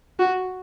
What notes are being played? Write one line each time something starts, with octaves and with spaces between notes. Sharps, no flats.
F#4